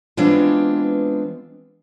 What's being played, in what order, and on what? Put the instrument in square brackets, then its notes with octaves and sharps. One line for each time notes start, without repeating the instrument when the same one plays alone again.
[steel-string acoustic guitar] E3 G#3 B3 C4 D4 F4